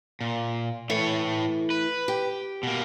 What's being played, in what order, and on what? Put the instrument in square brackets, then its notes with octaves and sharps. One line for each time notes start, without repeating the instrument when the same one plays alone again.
[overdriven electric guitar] A#2
[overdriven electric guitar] A2 C#5 [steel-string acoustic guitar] E3 A3
[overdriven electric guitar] B4
[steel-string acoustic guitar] G4
[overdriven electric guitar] B2 A#3